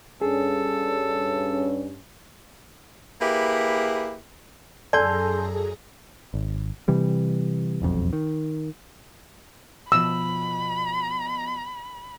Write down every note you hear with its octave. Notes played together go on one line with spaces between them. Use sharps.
G2 C#4 G#4 A4
A#3 E4 G4 G#4 B4
F#2 G#4 A4 D5 G#5 A#5 C6 G6
G#1
C3 E3 G3
E1 B1 F2
D#3
B2 F3 B5 E6